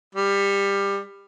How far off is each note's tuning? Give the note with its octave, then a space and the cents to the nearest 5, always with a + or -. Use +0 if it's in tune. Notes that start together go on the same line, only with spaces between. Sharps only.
G3 +20